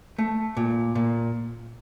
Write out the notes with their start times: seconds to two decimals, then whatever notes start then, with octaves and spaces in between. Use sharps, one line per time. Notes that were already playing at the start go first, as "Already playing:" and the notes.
0.19 A3
0.57 A#2
0.95 A#2